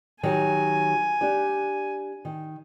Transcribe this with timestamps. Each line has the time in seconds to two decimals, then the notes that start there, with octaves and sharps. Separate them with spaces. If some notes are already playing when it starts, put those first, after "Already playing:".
0.23 D#3 F#3 G4 G#5
1.21 D4 G4 D5
2.25 D#3